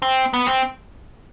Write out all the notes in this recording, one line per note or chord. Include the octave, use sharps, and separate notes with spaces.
C4
B3
C4